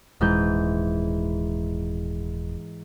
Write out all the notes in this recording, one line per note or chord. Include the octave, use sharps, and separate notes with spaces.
D#1 G#2 E3 G6